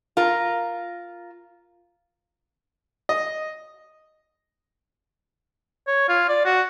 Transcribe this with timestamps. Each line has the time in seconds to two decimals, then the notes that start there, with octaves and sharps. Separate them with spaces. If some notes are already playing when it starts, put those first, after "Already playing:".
0.17 F4 A#4
3.09 D#5
5.87 C#5
6.08 F4
6.29 D5
6.45 F#4